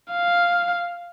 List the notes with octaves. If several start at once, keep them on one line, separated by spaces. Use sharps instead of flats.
F5